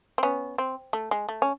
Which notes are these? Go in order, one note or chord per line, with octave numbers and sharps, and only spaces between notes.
C4
B3 C#4
C4
A3
G#3
A3
C#4